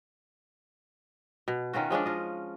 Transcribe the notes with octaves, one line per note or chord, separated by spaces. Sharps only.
B2
D#3 C#4 F4 F#4
F3 G#3 C#4 D4
F4 D#5